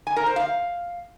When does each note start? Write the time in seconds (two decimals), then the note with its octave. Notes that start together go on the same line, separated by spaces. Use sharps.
0.07 G#5
0.17 A#4
0.26 C5
0.36 F5